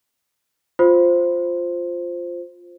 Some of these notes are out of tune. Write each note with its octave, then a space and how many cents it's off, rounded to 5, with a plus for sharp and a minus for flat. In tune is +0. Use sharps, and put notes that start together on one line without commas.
F4 +5 C5 +0